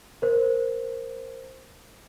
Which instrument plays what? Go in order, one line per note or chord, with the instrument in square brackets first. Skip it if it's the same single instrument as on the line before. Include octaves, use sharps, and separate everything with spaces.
[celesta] A#4 C5